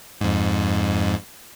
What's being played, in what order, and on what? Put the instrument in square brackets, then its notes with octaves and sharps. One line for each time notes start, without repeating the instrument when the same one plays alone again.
[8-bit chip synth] F2 G#2